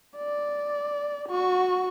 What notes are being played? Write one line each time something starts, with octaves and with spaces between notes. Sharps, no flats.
D5
F#4 C#6